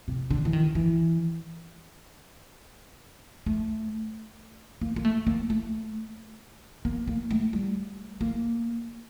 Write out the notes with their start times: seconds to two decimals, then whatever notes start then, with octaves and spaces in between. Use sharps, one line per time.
0.08 C3
0.31 D3
0.45 E3
0.53 D#3
0.75 E3
3.46 A3
4.81 A#3
4.96 A#3
5.05 A3
5.27 A#3
5.50 A3
6.85 A#3
7.08 A#3
7.31 A3
7.53 G3
8.21 A#3